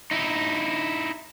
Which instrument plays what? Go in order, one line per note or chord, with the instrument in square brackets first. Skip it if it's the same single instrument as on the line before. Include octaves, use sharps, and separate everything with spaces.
[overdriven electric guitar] D#4 E4